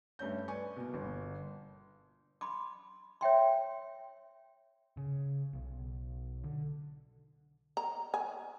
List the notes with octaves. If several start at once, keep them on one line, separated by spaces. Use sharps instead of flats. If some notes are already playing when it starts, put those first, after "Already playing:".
G2 A3 C#4 G6
B4 D5 G#5 C#6
B2 A#3
G1
B5 C6 D6
C#5 E5 G5 C6
C#3
B1
D3
A#5
G#5